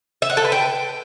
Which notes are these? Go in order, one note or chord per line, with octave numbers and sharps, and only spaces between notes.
E5
F#5
A4
B4
G5